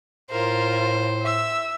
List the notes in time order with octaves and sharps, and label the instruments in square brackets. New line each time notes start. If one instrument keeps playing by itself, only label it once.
[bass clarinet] A2 [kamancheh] F4 A#4 [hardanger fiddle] C5
[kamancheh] E5 E6